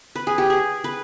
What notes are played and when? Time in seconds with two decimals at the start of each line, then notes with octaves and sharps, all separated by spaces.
0.16 B4
0.27 G#4
0.38 G4
0.50 G#4
0.84 B4